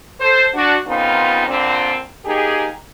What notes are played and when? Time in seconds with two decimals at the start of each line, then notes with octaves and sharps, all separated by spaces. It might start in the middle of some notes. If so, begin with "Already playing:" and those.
0.20 A4 C5
0.54 D4 F#4
0.87 A#2 C#3 B3 C4 D#4 F4
1.47 A#2 D3 C4
2.26 A#3 D#4 G4 G#4